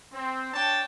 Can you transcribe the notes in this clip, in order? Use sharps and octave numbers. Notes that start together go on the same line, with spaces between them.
C4
D4 C#5 G5 A5